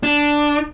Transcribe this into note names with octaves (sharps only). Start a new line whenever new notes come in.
D4